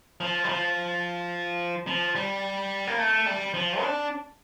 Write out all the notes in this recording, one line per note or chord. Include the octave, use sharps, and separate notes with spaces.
F3
G3
F3
F3
G3
A#3
A3
G3
F3
D4